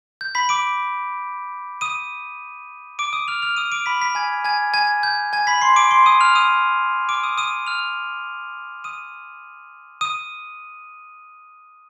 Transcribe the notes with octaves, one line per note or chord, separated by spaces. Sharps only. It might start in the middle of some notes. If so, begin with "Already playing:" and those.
G6
B5 B6
D6 D7
D#6 D#7
D6 D7
D#6 D#7
F6 F7
F6 F7
D#6 D#7
D6 D7
B5 B6
B5 B6
G#5 G#6
G#5 G#6
G#5 G#6
G6
G#5 G#6
B5 B6
C6 C7
D6 D7
C6 C7
D#6 D#7
F6 F7
D#6 D#7
D6 D7
D#6 D#7
D#6 D#7
F6 F7
D#6 D#7
D#6 D#7